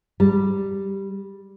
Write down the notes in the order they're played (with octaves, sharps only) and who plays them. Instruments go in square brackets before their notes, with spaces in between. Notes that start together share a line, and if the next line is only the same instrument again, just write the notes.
[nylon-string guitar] G3